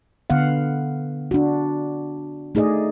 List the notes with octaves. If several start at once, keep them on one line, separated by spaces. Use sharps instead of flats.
D3 B3 F5 F#5
D4 F#4
A3 D#4 G#4 D5 D#5